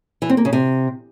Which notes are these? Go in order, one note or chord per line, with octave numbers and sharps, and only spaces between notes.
E3
C4
A#3
C#3
C3